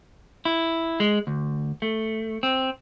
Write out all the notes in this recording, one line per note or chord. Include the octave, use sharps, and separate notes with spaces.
E4
G#3
D2
A3
C4